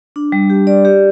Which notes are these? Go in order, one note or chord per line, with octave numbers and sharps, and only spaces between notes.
D4
G3
G4
D5
G4